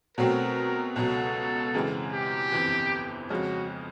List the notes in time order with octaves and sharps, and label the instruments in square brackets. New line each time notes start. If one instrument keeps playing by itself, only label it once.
[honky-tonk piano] B2 F#3 A3 C4 [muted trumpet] A#4
[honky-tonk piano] C#2 B2 F#3 [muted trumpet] A4
[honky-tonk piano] F#2 C#3 E3 G#3 C4
[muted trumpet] G4
[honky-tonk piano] G1 F2 C3 E3
[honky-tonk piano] F2 C#3 F3 G#3 C#4 [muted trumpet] F#4